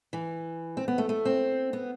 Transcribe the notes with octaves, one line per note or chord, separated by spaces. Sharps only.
E3
C4
B3
A3
A3
C4
B3